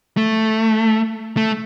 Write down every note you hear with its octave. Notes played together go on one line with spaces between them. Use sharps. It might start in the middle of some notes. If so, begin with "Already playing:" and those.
A3
A3